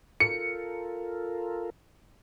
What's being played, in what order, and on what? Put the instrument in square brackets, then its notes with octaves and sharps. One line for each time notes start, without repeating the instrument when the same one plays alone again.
[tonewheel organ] F4 A4 A#4 [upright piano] C#7